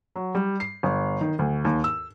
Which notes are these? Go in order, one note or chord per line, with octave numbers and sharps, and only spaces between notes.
F#3
G3
C7
G1
D#3
D2
D#2
E6